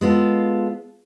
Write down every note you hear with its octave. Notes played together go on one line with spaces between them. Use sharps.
G#3 B3 F4 A4